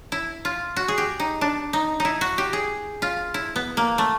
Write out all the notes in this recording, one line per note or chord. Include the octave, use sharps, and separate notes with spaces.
E4
F4
F#4
G#4
G4
D#4
D4
D#4
D#4 E4
F#4
G4
G#4
F4
E4
B3
A#3
A3